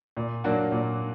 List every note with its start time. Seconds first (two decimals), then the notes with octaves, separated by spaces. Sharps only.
0.17 A#2
0.44 F#3 A#3 D4 F#4
0.72 A#2